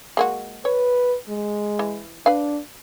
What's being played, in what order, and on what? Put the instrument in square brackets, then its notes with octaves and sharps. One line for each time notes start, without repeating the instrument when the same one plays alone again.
[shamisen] G#3 A#3 F#4
[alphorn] B4 [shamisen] C#5
[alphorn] G#3
[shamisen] E3
[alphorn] D4 [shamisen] B4 F5